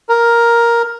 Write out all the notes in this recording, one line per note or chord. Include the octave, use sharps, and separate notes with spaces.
A#4